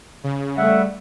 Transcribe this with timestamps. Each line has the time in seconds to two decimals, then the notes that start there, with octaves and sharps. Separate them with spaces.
0.24 C#3
0.57 G3 A3 E5 F#5